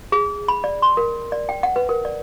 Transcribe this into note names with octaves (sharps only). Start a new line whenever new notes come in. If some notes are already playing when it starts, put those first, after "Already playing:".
G#4
B5
D5
C6
A#4
D5
G5
F#5
B4
A#4
D5